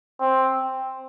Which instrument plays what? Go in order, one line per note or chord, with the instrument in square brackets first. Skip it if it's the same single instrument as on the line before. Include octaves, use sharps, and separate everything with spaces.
[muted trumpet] C4